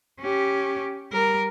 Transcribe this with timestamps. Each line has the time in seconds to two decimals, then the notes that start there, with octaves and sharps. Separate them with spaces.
0.20 C#4 G4
1.12 G3 A#4